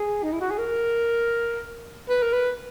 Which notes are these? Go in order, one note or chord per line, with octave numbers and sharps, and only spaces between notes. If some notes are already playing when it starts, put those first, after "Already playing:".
Already playing: G#4
D#4
E4
F#4
G#4
A#4
B4
A#4
B4